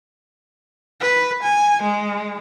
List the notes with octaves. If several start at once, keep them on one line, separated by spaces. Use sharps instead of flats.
B4
G#5
G#3